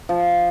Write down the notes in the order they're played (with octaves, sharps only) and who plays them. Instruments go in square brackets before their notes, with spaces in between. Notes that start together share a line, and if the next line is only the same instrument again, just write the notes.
[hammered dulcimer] F3